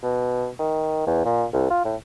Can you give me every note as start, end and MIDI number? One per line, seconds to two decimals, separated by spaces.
0.03 0.49 47
0.59 1.06 51
1.07 1.23 40
1.25 1.46 46
1.53 1.66 36
1.70 1.83 65
1.85 1.96 45